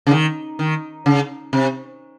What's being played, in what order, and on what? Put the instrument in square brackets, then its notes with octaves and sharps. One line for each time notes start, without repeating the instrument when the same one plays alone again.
[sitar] C#3
D#3
D#3
C#3
C3